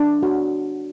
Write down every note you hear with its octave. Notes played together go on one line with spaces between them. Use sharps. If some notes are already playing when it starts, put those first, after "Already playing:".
Already playing: D4
F#4